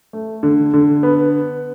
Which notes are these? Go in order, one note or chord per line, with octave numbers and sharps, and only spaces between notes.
A3
D3
D3
B3